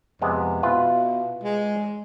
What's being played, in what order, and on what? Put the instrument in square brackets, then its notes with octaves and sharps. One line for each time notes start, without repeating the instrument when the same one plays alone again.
[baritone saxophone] F2 [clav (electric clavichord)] C3 G#3 B3
[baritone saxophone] B2 [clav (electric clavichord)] E4 F4 B4
[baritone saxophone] G#3